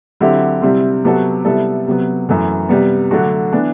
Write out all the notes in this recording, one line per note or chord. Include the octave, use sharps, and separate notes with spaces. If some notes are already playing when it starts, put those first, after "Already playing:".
D3 F#3 C4 E4 G4
C3 G3 C4 E4
C3 F#3 B3 F#4 A4
C3 G3 B3 E4 A4
C3 F#3 B3
F#2 E3 A3
C3 G3 B3
D3 F#3 A3 D4 F#4
E3 B3 D4